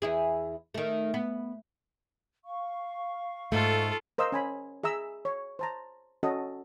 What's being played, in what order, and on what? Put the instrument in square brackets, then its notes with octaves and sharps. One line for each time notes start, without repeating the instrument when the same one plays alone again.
[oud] E2 E4 G#4
D#3 A3
B3
[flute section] F5 C#6
[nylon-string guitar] G#2 A3 [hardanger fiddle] F4 A4
[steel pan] A#4 C5 D#5 F5 E6
C#4 G#5 B5
G#4 E5 A#5 E6
C#5
C5 A5 A#5
C#4 F#4 A4 D#5